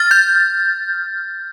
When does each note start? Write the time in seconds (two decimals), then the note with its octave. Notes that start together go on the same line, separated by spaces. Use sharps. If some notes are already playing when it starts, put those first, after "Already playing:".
Already playing: F6 A6
0.11 G6